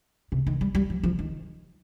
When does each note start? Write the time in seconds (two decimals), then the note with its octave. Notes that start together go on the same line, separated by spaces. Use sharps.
0.32 C3
0.47 D#3
0.61 G3
0.75 G3
0.90 F3
1.03 F3
1.19 D#3